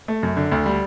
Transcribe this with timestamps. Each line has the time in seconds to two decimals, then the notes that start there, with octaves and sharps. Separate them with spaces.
0.08 A3
0.23 F#2
0.37 D3
0.52 D2
0.66 G3